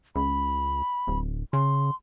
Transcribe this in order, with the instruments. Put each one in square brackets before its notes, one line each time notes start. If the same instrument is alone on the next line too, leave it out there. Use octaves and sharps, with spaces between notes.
[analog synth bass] C#2 [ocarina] B5
[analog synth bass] D1
[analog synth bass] C#3 [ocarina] C6